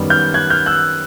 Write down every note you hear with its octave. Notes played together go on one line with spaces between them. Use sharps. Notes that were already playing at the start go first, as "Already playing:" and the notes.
Already playing: F#2 D#3 G3 B3
F6 G6
F#6 G#6
F6 G6
E6 F#6